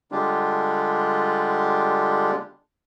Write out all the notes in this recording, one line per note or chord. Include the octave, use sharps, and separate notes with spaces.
D3 G3 G#3 D4 F4 G4